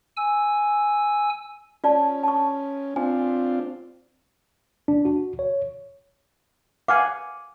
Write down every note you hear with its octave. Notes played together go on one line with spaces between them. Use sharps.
G#5 E6
C#4 F4 D5 A5
A5 C#6
C4 D4 F4 G#5
D4
F#4
C#5
F5 F#5 G#5 D6